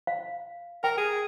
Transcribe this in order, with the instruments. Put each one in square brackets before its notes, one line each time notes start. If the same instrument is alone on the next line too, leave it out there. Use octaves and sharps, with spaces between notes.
[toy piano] F5
[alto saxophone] A#4 [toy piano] G5
[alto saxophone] G#4